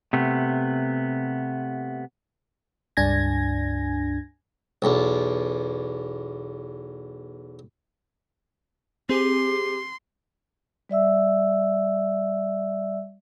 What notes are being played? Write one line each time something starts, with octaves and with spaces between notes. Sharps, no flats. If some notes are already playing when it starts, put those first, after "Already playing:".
C3 A3 B3
C#2 G2 D4 G#5 G#6 A#6
B1 E2
C4 G4 G#4 C6
G3 D5 E5 E6